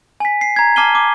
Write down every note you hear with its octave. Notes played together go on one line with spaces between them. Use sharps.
G#5 B6
C7
A#5 G#6
A5 D6 F6 C7 D#7 G7
D6